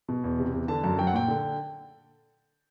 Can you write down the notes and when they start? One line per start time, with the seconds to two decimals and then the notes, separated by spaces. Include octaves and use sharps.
0.09 B2
0.24 E2
0.39 C3
0.53 E2
0.68 D3 A5
0.83 F#2 A5
0.99 F#3 G5
1.07 F#5
1.14 A#2 G5
1.28 D3